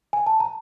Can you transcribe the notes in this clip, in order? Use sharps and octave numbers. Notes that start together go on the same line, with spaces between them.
G#5
A5
A#5